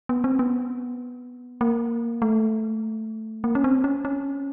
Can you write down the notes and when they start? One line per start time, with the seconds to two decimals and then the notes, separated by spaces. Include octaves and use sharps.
0.09 B3
0.24 C4
0.39 B3
1.61 A#3
2.22 A3
3.44 A#3
3.55 C#4
3.64 C4
3.84 C#4
4.05 C#4